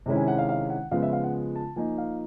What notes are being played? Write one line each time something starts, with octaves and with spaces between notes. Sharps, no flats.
C3 D#3 G#3 C#4 E4
G#5
F#5
F5
F5
F#5
C#3 F3 G#3 B3 F5
E5
F5
F#5
A5
F3 A#3 D#4 G#5
F5